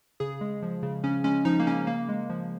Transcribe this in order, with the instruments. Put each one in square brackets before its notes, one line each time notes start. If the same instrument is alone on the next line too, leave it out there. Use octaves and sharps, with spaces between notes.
[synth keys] C#3 G#4
G#3
F3
C#3
C#3 C#4
G#3 C#4
F3 D#4
A#3
C#3 C#4
C#3 A#3
G#3
F3